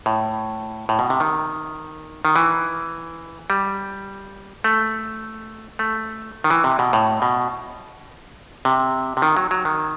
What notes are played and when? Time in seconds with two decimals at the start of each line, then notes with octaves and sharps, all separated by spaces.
0.06 A2
0.89 A2
0.99 B2
1.10 C3
1.20 D#3
2.25 D#3
2.36 E3
3.50 G3
4.64 A3
5.79 A3
6.44 D#3
6.50 E3
6.64 C3
6.79 B2
6.93 A2
7.22 B2
8.65 C3
9.17 C3
9.22 D#3
9.37 F#3
9.51 F#3
9.65 D#3